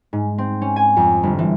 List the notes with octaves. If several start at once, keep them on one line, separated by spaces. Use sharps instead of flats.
G#2
C4
C#4
G#5
F2
G1
E3